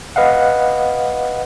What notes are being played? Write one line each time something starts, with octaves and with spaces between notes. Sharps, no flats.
B4 D#5 F5 F#5